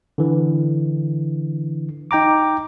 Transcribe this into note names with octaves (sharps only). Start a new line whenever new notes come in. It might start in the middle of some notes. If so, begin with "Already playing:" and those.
D3 E3
D#4 G5 A#5 D6